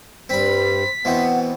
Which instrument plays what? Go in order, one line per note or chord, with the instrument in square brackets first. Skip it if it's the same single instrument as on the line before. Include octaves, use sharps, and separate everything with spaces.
[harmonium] G2 G3 [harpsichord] C4 B5 [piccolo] B6
[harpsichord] B2 E3 C4 [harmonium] B3 [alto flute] F#5